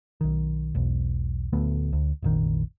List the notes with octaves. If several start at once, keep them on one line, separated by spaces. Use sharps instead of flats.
B1 D#3
E1 B1
D1 D2 A3 B3
D2
F1 A#1 D#3